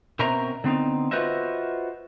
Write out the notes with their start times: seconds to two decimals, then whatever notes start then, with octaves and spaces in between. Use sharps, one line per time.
0.19 B2 C4 C#4 A#4 E5 A#5
0.64 D3 B3 C4 D#4
1.11 F4 F#4 B4 C5 D#5 E5